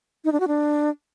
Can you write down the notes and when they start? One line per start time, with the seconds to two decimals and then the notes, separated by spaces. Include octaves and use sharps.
0.25 D#4
0.32 D4
0.40 F#4
0.48 D4